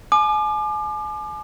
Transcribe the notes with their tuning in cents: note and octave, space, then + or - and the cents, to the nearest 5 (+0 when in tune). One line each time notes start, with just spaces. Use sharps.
G#5 +40 D6 +35